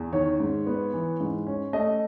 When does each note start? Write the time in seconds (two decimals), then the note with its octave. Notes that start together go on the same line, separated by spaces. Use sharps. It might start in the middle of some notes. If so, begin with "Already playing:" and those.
Already playing: E2
0.13 D#3 C#5
0.40 G#2
0.67 B3
0.94 E3
1.20 G#2
1.47 C#4
1.73 A3 D#5